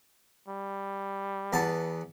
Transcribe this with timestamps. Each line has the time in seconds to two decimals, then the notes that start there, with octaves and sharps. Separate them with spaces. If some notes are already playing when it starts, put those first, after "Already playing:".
0.48 G3
1.53 E2 B3 A5